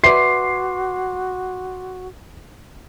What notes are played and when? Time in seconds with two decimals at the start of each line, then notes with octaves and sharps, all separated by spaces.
0.04 F#4 B4 D5 E5 C6 D6 C7